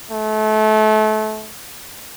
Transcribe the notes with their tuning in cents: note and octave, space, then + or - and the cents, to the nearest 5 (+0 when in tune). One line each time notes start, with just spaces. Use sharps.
A3 -30